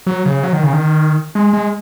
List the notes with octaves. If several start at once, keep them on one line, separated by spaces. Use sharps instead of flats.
F#3
C#3
F#3
D#3
C#3
D#3
G#3
G#3